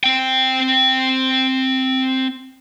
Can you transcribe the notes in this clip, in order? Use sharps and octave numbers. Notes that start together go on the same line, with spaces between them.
C4 G5